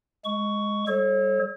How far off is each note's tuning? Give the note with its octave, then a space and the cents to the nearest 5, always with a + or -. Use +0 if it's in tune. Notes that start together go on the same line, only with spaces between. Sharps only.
G#3 +0 C#6 +10
G3 +0 A4 -30 C#5 -45